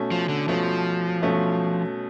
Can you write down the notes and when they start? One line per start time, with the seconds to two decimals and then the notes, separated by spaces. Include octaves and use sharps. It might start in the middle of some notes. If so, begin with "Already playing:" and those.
Already playing: B2 A3 C#4
0.11 F3
0.29 D3
0.48 B2 F3 A3 C#4
1.22 B2 A3 C#4